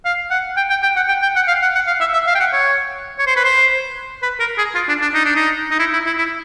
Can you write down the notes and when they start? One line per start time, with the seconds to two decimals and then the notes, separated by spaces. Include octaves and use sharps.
0.05 F5
0.30 F#5
0.57 G5
0.70 G5
0.83 G5
0.96 F#5
1.08 G5
1.22 G5
1.36 F#5
1.48 F5
1.62 F#5
1.75 F#5
1.87 F5
2.00 E5
2.13 E5
2.27 F5
2.35 G5
2.40 F#5
2.53 C#5
3.19 C#5
3.27 C5
3.36 B4
3.45 C5
4.23 B4
4.40 A#4
4.58 G#4
4.75 F4
4.88 D4
5.02 D4
5.14 D#4
5.25 D4
5.36 D#4
5.71 D#4
5.79 E4
5.93 E4
6.06 E4
6.18 E4